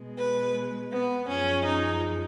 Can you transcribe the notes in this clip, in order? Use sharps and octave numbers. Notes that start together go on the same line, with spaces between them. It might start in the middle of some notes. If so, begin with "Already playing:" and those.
Already playing: B2 G#3
B4
B3
F#2 F3 G#3 C#4
D#4